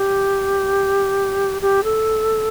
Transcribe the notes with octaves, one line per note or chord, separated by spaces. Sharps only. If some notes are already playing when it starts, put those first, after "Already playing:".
Already playing: G4
G4
A4